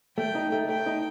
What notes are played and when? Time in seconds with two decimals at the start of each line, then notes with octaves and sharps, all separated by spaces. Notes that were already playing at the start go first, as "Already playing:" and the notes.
0.18 A3 G5
0.35 D#4
0.52 A3
0.69 A3 G5
0.86 D#4